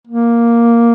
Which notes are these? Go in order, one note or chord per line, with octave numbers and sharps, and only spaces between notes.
A#3